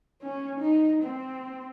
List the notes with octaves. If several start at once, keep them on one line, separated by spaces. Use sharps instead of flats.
C#4
D#4
C4